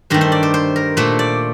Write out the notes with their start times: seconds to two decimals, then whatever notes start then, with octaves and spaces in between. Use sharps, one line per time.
0.10 G2 D#3 A3 C5
0.21 C5
0.32 D5
0.43 C5
0.54 C5
0.76 A#4
0.97 A#2 A3 C5
1.19 D5